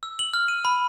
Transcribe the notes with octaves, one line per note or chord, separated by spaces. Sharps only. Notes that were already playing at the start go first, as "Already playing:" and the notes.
E6
F#7
F6
D#7
B5